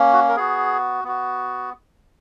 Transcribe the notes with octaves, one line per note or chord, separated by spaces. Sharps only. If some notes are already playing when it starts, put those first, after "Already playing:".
Already playing: A#3 C#4
F#4
A#4
B3 F#4 G#4
B3 F#4